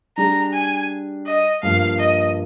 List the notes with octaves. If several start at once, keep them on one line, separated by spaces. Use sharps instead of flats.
G3 D4 G#4 A#5
G#5
D#5
G2 F3 A#3 F5
D#5